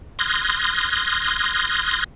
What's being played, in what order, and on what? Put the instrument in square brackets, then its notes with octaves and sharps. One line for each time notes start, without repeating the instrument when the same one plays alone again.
[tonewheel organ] C6 D#6 F6 F#6 G#6 A#6